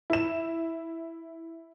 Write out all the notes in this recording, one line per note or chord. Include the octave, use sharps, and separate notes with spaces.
E4 E7